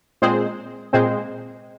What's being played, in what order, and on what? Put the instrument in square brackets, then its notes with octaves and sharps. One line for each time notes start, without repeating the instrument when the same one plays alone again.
[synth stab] A#2 G#3 C4 G#4 C5
A#2 G#3 C4 G#4 C5